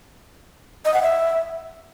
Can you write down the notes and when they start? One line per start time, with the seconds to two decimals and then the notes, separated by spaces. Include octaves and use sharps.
0.85 D#5
0.94 F#5
1.02 E5